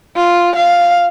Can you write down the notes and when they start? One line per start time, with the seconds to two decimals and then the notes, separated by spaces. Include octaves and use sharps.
0.17 F4
0.56 F5